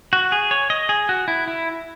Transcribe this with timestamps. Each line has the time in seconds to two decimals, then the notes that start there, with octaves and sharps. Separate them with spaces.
0.13 F#4
0.32 G#4
0.51 C#5
0.70 D#5
0.89 G#4
1.09 F#4
1.28 E4
1.48 E4